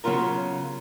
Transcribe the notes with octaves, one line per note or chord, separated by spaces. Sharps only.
C#3 F#3 B3 F4 A#4